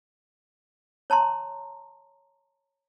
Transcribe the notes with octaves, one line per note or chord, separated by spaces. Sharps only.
C#5 A5 A#5 C6